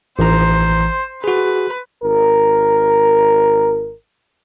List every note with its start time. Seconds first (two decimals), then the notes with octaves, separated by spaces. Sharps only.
0.19 A1 E3 C5 A#5
1.24 F#4 G#4 B4
2.03 G#1 A#4